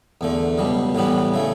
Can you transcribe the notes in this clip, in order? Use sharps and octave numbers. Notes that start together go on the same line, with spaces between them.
E2 D3 A3
C#2 B2 G3
A2 E3 G3 B3
C#3 E3 A3